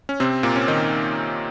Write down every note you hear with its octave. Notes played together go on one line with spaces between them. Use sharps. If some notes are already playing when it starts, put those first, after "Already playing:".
C#4
C3 C4
A#2 A#3
C#4
D#3 D#4